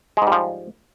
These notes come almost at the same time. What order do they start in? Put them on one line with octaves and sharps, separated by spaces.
G#3 G#2 G3 F3